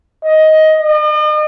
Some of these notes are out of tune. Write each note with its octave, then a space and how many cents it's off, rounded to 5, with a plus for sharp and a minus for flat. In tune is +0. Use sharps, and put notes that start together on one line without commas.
D#5 +10
D#5 -45